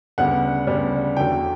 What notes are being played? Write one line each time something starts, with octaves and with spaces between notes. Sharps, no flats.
D2 C#3 G3 B3 F#5
D2 C#3 G3 B3
E2 D3 F#3 A3 G5